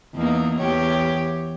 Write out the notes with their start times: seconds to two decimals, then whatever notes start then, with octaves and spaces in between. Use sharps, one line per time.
0.15 E2 A#3 D#4
0.58 E2 G4 C#5